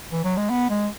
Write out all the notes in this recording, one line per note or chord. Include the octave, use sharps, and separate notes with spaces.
E3
F#3
G#3
B3
G#3